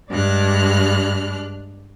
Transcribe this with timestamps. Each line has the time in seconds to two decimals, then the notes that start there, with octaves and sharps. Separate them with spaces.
0.10 G2 G#3 D4 F6 F#6